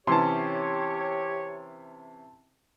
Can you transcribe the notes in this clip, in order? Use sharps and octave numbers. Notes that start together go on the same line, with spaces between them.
C3 E3 C#4 G4 C#5 A5 C6